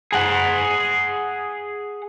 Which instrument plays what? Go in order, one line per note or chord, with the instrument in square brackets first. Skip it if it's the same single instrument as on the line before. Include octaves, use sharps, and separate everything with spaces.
[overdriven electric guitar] G#4 F#5